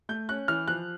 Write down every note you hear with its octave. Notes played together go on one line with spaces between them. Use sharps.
A3 G6
C#4 F#6
E3 F6
F3 F#6